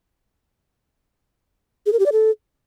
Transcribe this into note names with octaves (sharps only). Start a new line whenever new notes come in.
G#4
A#4
G4
D5
A4